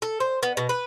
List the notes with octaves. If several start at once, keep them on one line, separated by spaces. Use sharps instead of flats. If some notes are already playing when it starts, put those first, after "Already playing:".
A4
C5
B3
B2
B4